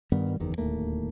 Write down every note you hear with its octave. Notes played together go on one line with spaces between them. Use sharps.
G2 D#3 G3 B3
F#1 E2 D#3
D1 D#2 A3 A#3